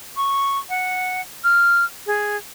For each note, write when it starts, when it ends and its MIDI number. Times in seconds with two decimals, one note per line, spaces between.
0.17 0.59 85
0.69 1.21 78
1.44 1.85 89
2.07 2.36 68